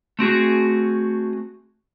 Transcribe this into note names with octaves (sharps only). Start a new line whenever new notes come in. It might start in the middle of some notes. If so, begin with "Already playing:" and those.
A3 C4 F#4 G#4